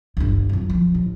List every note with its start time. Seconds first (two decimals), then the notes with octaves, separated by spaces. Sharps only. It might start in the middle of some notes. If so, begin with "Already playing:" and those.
0.17 G1 D2
0.49 F2 F#3
0.70 F3
0.94 A1